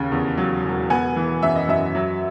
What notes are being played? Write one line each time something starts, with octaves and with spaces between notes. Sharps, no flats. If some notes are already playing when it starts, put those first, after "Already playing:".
Already playing: D#2 C#3
E2
F#3
E1
B3 G#5
E3
F#2 E5
D#5
F#2 E5
F#3